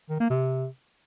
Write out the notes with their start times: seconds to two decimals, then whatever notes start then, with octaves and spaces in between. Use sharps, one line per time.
0.10 D#3
0.20 A#3
0.31 C3